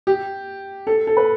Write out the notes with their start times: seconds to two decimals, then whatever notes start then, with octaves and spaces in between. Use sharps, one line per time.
0.07 G4
0.87 A4
1.07 A4
1.17 B4